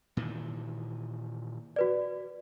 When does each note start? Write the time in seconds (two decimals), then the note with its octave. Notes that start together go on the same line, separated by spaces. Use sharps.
0.17 A#2 D#3 E3
1.76 F#4 B4 D5